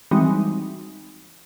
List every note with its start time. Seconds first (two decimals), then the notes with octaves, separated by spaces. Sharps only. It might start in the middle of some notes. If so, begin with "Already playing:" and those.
0.11 E3 G3 G#3 C4 D#4 F#4